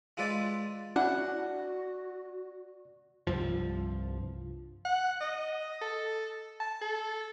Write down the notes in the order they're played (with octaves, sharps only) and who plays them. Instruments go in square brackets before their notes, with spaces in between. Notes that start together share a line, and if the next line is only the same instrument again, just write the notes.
[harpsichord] G#3 F4 A4 B4 D5
[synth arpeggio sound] C#4 D4 E4 [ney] F#4 [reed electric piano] D5 [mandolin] F#5
[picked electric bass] C2 G2 F3
[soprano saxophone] F#5
D#5
A4
A5
A4